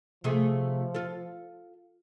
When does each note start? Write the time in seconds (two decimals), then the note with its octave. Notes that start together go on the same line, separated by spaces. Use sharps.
0.24 C3 F3 A3 G#4
0.94 F4 A4